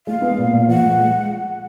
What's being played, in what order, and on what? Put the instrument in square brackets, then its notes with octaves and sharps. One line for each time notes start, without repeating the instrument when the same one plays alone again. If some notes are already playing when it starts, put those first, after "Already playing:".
[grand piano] G#3 [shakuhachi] F5
[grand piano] B3
A#2
A#2
[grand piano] F3 [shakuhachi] F#5
[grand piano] G#3
G#3